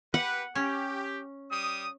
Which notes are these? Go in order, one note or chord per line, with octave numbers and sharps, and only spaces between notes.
G4 B4 F#5
C#4 G4
G3 D#6